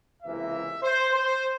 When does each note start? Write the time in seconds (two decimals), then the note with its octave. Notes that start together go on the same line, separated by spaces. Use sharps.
0.23 C#2 C3 E3 A#3 E5
0.83 C5
1.13 C5